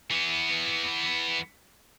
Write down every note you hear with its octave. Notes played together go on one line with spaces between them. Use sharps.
E3 B3